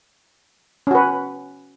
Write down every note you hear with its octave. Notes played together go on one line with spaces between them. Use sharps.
C#4 F#4 B4